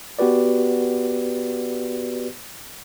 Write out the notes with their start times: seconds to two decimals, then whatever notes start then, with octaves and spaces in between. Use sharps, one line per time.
0.19 B3 F#4 G4 B4 D5